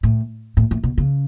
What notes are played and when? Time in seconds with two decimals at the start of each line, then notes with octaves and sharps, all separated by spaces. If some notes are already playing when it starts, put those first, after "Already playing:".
0.03 A2
0.57 A2
0.71 A2
0.83 B2
0.98 C#3